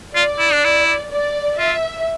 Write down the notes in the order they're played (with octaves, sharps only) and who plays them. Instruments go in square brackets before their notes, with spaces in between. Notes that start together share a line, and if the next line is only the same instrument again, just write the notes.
[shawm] F4 [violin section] D5
[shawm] E4
D4
E4
[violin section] D5
[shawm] F4 [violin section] E5